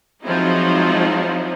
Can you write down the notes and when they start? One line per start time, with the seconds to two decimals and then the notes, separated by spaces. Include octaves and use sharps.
0.23 F3 F#3 G#3 C4 D#4 E4